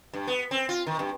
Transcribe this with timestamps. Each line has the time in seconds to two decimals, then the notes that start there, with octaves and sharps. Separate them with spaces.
0.14 G2
0.27 B3
0.51 C4
0.69 F4
0.87 D#3
0.99 G2